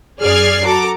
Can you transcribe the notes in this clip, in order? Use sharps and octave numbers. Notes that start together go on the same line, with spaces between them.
F#2 G#4 D5 F6 G#6 C7
F#4 A4 A#5 D6